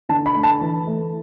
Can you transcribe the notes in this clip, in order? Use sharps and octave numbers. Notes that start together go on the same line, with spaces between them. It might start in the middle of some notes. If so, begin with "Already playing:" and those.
D3 A5
B5
A3
A5
E3
A3